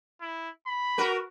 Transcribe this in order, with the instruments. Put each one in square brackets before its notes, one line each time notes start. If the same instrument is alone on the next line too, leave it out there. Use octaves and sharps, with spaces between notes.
[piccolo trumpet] E4
B5
[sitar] F#4 A#4 B4